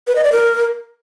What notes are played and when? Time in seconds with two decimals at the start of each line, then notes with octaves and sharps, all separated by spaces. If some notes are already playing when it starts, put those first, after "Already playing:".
0.07 B4
0.16 D#5
0.24 D5
0.32 A#4